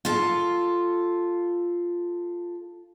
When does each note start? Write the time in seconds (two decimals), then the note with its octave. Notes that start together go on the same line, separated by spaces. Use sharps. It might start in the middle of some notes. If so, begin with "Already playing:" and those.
0.05 F4 A4